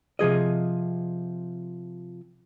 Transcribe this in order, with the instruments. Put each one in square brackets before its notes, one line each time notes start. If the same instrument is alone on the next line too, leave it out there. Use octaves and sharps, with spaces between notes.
[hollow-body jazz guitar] C3 F3 G#4 D#5